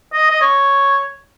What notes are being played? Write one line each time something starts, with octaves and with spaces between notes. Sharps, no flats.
D#5
D#5
C#5